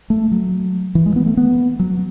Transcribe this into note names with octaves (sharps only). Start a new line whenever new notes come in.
A3
F#3
E3
G#3
B3
A3
B3
F#3